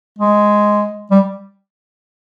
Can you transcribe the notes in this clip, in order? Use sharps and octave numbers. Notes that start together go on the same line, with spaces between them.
G#3
G3